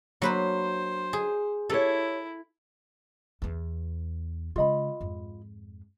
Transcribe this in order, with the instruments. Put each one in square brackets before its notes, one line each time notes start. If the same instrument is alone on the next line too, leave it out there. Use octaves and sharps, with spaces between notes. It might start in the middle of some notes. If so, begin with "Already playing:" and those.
[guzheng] F#3 B4 B5 [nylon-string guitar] A#3 D4 [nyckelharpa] C5
[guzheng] G#4
[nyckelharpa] E4 [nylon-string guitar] G4 C#5 [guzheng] A4
[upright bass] E2 B3
[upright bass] C#3 G#3 [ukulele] F4 D#5 B5
[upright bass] F2 G#2